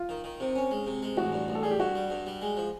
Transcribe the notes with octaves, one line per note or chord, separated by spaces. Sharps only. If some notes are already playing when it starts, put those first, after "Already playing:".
Already playing: F4
D#3
D#3
C3
C#4
G#3
C3
G#3
A1 F#4
G2
A1
A4
G3 G#4
G4
G2 F#4
G3
G2
G3
G#3
F3